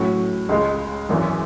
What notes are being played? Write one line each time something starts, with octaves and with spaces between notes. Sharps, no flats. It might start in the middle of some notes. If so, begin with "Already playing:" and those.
Already playing: A2 F#3 C#4
C#2 C#3 G#3
G#1 F#2 E3